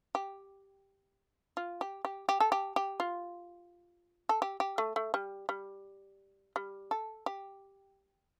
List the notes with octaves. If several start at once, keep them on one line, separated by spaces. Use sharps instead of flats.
G4
F4
G4
G4
G4
A4
G4
G4
F4
A4
G4
G4
A3
A3
G3
G3
G3
A4
G4